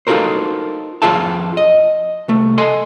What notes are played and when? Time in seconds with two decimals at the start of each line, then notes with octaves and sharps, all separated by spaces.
0.07 D#4 F4 F#4 A4 A#4 C5
1.02 F2 D#3 F4 G#4 E5 A5
1.57 D#5
2.28 C2 A3
2.58 A4 D#5 G#5 C6